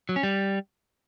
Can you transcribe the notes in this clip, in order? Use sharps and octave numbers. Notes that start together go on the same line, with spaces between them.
F#3
C#4
G3